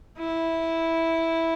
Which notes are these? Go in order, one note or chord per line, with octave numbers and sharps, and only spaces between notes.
E4